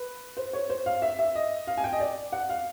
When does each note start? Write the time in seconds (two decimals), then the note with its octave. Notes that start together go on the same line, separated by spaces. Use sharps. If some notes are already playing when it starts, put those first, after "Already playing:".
Already playing: B4
0.37 C5
0.53 C#5
0.70 C5
0.86 F5
1.02 E5
1.19 E5
1.35 D#5
1.67 F5
1.77 G#5
1.84 G5
1.93 D#5
2.00 D5
2.32 F#5
2.49 F5